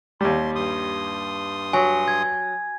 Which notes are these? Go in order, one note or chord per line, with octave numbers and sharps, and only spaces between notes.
D#2 G3 C6
G2 C6 D#6
F#3 G#5
G#6